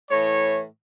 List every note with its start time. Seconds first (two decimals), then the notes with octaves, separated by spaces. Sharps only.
0.10 A2 E3 C#5